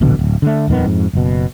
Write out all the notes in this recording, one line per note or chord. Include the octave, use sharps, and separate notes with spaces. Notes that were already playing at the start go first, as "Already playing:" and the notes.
D1 A#1 B2 D3
D1
D3 A3
D#1 F2 D#3 B3
F2 G#2
F#1 B2